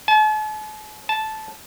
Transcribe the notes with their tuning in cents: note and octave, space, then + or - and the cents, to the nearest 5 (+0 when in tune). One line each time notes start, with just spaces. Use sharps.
A5 -45
A5 -10